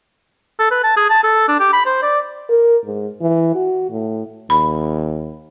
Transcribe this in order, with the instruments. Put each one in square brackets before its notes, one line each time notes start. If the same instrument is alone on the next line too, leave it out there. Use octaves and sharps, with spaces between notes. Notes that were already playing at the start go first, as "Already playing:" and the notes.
[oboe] A4
B4
A5
G#4
A5
A4
D4
G4
B5
C5
D5
[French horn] A#4
G#2
E3
F#4
A2
[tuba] D#2 [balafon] B5